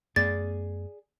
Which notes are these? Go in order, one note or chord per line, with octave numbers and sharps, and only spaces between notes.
F#2 A3 B3 G#4 D5 A6